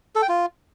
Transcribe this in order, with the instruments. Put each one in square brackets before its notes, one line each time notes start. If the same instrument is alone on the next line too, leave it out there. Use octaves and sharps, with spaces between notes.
[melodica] A4
G5
F4